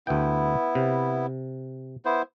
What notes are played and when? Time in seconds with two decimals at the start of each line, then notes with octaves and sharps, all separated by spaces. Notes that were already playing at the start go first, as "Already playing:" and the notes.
0.07 D2 B3 E4 G5
0.75 C3
2.05 B3 E4 C5